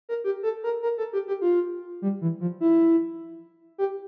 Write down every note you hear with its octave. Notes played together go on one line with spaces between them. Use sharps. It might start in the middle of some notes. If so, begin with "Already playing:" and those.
A#4
G4
A4
A#4
A#4
A4
G4
G4
F4
G3
E3
F3
E4
G4